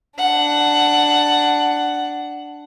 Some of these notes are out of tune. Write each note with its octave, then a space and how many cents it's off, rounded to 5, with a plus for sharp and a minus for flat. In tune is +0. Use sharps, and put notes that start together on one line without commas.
D4 +0 F#5 +10